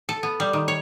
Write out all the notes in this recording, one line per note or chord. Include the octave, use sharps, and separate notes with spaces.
A4
B3
G3
D#3
C#5